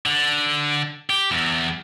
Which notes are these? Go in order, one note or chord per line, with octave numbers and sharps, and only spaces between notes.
D3
G4
E2 E3